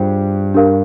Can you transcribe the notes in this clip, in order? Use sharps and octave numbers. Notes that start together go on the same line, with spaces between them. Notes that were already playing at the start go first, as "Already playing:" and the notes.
Already playing: G2 F4 G#4 C5 G5
D4 G4 A#4 F5